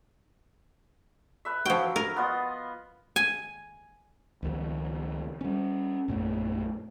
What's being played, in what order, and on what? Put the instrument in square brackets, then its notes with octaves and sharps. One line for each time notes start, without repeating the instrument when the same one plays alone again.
[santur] B4 E5
[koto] F3 G5 [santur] F#3
[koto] A#4
[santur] B3 F4 D#5
[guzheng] G#5
[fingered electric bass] C#2 D#3 F3
G3 C#4
A#1 F#2 A3